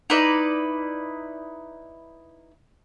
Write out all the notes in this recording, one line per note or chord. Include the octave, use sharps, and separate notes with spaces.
D#4 E4 B4 D5